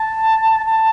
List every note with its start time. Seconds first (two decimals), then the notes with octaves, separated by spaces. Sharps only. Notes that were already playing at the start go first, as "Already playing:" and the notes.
Already playing: A5
0.66 A5